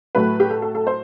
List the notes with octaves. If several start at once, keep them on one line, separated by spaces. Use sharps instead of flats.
A2 F#3 A3 B4
G4
A4
A4
A4
C5